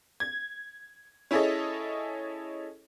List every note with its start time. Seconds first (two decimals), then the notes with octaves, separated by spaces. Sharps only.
0.20 G#6
1.31 C#4 E4 G#4 A4 C#5 D#5